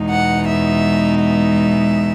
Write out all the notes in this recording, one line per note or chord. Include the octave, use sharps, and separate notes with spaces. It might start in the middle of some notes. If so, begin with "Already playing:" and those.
Already playing: E2 B2 G#3 D#4
F#5
E5
E5